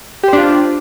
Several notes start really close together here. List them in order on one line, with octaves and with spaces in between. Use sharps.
G4 C5 D4 F4